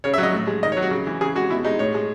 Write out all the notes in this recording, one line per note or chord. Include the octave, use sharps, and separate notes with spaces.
C#3 C#5
E5
F#3
D#5
A2
G#3
D#3 D#5
C#5
F#3
F#4
C#3
E3
C#3 G#4
G#3 F#4
B2 E4
G#3 D#4
A2 C#5
G#3